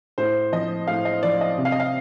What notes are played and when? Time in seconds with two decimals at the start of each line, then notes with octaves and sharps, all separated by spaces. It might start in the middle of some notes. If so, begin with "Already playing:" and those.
0.18 A2 C5
0.52 F3 D#5
0.87 A2 F5
1.05 D#5
1.23 F3 D5
1.41 D#5
1.58 C3
1.65 F5
1.72 D#5
1.80 F5